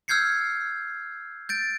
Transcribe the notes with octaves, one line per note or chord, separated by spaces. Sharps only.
E6 F6 G6 G#6 C7 C#7
G6 A6 D7